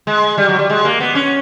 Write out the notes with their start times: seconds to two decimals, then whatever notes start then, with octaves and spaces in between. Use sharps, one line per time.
0.07 G#3
0.38 G3
0.48 F#3
0.59 G3
0.69 G#3
0.85 A#3
1.00 B3
1.15 C#4